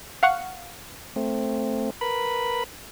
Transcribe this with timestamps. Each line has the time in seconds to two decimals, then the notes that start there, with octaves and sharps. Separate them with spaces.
0.23 F5 F#5 C#6
1.16 A3 C4
2.01 A#4 B4 B5